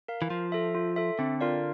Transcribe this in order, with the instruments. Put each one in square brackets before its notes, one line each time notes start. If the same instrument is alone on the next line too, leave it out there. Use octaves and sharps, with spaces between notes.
[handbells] A#4 F5
[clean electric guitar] E3
[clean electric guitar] F3 [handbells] F4
[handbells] A4 E5
F4
A4 E5
[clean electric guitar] D3 [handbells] C4
[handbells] F4 A#4 D5 F5